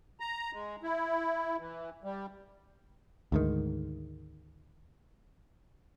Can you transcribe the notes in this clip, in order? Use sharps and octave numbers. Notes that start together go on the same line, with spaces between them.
A#5
G#3
E4
E3
G3
D2 G#2 D#3